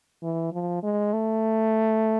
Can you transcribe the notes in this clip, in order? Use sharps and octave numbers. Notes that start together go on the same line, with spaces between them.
E3
F3
G#3
A3